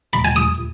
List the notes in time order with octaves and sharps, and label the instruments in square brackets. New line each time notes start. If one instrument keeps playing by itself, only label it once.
[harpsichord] B5
G#5
D#6